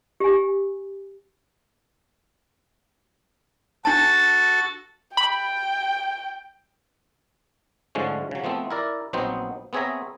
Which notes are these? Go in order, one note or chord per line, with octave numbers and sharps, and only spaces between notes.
G4 G#5
D4 F#4 A4 A5 A6
G5 B5
G#2 D3 F3 G#3 A3 C#4
C#3 F#3
F3 A3 B3 C4
E4 A#4 D5
A#1 F#3 B3 C4 D#4 C5
B3 C4 G#4 C#5 E5 A#5